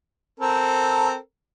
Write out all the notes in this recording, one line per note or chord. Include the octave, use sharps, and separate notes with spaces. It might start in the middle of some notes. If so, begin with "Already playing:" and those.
C4 A4 A#4